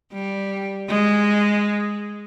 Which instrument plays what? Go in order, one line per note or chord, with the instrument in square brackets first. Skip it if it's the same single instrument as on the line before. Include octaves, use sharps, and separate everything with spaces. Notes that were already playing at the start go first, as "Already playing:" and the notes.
[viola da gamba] G3
G#3